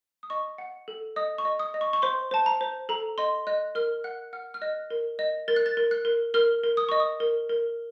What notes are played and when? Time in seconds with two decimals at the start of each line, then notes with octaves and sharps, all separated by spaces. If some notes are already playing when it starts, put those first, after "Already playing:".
0.23 D#6
0.30 D#5 C#6
0.58 F#5
0.88 A4
1.16 D#5 D#6
1.38 C#6
1.45 D#5
1.59 D#6
1.74 D#5
1.81 C#6
1.93 C#6
2.02 C5 C6
2.31 C5 A5
2.46 A#5
2.61 C5
2.89 A4 A#5
3.18 D#5 C6
3.47 D#5 F#6
3.75 A#4 F6
4.04 F#5 F#6
4.33 F#5 F6
4.54 F6
4.62 D#5 F#6
4.90 A#4
5.19 D#5
5.48 A#4 A6
5.56 F#6
5.66 A6
5.77 A#4
5.91 F#6
6.05 A#4
6.34 A#4 F6
6.64 A#4
6.77 D#6
6.89 D#5 C#6
7.00 D#6
7.20 A#4
7.49 A#4